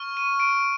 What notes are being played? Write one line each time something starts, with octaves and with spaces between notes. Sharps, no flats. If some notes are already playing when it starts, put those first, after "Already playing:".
Already playing: C#6 F6
D#7
D7